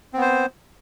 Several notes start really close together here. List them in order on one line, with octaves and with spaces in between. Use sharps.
C4 B3 C5